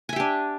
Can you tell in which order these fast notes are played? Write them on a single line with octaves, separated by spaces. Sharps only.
G#5 E5 G4 D4